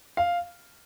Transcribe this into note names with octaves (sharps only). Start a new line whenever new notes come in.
F5